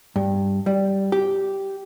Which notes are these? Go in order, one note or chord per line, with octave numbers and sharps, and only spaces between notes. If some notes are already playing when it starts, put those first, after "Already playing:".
G2
G3
G4